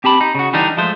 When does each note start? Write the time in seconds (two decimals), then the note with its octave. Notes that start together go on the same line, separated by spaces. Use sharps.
0.04 C4 G4 A5 B5
0.21 D#4
0.35 C#3 F#4
0.53 D3 E3 G3 D4 D#4
0.77 F3 G#3 A3 C5